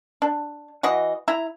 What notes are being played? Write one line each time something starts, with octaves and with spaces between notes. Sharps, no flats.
D4
E3 F#4 D#5
E4 E5 A#5